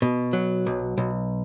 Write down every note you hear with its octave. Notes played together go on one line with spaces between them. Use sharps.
B2
F#3
B1
B1